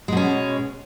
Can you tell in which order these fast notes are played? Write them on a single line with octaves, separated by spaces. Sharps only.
G#3 B2 C#4